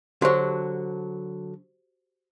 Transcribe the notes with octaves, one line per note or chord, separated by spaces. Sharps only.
D3 F#3 F#4 G4 C5